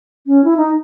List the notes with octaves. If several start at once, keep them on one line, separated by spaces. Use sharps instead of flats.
C#4
E4
D#4